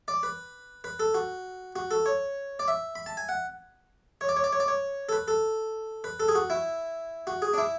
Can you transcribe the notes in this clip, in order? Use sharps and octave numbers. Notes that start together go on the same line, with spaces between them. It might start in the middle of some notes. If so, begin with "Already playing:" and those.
D5
B4
B4
A4
F#4
F#4
A4
C#5
D5
E5
B5
A5
G#5
F#5
C#5
D5
C#5
D5
C#5
D5
C#5
A4
B4
A4
B4
A4
G#4
F#4
E4
F#4
G#4
D4
E4